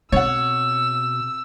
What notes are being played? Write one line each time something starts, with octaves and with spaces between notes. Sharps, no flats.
B2 C4 C#5 F#5 E6